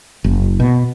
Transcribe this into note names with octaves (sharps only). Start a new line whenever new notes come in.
F#1
B2